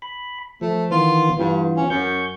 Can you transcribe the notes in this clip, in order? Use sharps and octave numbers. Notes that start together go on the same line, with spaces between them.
B5
F3 A3
D#3 E3 B3 F4
G2 E3 B3 F4
C#4
F#2 C#6 G6